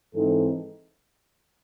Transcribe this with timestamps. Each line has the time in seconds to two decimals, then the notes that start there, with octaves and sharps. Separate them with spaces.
0.14 G#2 E3 C4 D#4 A4